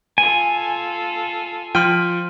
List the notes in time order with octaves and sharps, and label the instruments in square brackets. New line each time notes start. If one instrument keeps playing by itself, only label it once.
[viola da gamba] F4 A4 [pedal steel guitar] G#5
[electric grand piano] F3 G5 [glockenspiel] C6 F6 D#7